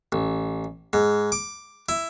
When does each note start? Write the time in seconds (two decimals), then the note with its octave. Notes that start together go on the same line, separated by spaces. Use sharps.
0.12 A1
0.93 G#2
1.32 D6
1.89 E4